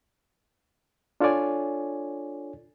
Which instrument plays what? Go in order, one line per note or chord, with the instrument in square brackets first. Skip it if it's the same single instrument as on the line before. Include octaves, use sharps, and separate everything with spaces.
[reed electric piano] D4 F4 A4 C#5 D5 G#5